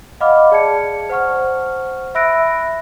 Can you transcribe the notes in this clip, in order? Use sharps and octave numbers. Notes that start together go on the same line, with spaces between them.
D#5 F5 F#5 B5 D6 F6
G#4 D5 A5 G#6 C#7
C5 F#5 C#6 F6
E5 B5 E6 F#6 A#6 D7